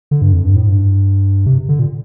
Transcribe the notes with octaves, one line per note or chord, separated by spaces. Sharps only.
D3
G2
F2
G2
A2
G2
C3
D3
A#2